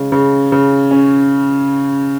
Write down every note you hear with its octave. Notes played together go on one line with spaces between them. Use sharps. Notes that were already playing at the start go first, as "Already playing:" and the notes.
Already playing: C#3 G#3
C#3
C#3
C#4